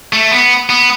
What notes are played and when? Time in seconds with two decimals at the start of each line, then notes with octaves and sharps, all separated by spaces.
0.13 A3
0.31 B3
0.70 B3